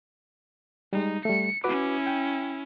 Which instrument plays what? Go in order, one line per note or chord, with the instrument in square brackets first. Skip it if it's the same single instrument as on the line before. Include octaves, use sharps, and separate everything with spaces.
[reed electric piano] G3 G#3 [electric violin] D#4
[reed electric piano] G3 A3 [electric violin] C#7
[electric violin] C#4 E4 [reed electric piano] F#4 B4 D6
[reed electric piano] G5